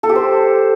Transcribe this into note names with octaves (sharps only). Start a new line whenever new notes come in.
A4
G4
C5